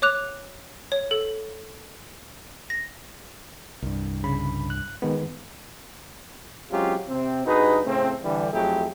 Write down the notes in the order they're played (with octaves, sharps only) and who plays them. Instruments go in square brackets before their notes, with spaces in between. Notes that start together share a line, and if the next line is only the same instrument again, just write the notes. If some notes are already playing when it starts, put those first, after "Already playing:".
[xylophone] C#5 D6 F#6 F7
C#5
A4
A#6
[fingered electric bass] C2 G2
[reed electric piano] C#3 B5
F#6
D#3 G#3 B3
[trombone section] F#3 G#3 C4 C#4 F4 G4
C3 C4
G2 D#4 F#4 G#4 B4
A2 C#3 A3 C4
D3 E3 G3
F2 F#3 A3 E4 G4 G#4